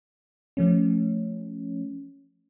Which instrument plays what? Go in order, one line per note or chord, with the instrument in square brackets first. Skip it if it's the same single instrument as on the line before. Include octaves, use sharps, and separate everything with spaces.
[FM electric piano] F3 A3 C#4